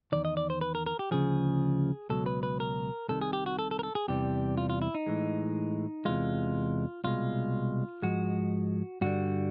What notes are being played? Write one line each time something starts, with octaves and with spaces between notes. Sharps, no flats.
E2 C3 D#3 D5
D#5
D5
C5
B4
A#4
A#4
G4
D2 C#3 F3 G#4
C#2 B2 F#3 A4
B4
B4
A#4
C2 C3 D#3 A4
G#4
G4
F#4
A4
A4
A#4
A4
G#4
E2 C3 E3 G3 G4
F4
F4
E4
D#4
A2 E3 G#3
E2 C3 E3 G#3 F4
C2 B2 G#3 F4
G#2 F3 G#3 F#4
G2 D3 G3 F#4